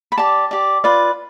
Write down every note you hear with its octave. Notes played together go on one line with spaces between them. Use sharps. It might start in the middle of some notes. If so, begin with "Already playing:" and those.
B5
G4 D5 A5
G4 D5
F4 B4 D5